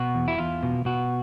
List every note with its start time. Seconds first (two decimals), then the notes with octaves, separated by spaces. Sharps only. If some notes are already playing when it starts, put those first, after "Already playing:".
Already playing: B2 F#4
0.15 E2
0.28 E4
0.38 E2 F4
0.63 B2
0.85 B2 F#4